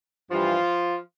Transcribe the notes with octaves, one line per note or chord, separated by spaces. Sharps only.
G2 E3 F3 G3 F4